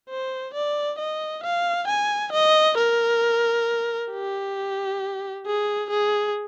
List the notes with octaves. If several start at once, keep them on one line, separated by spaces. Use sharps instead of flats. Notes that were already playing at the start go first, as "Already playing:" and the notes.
C5
D5
D#5
F5
G#5
D#5
A#4
G4
G#4
G#4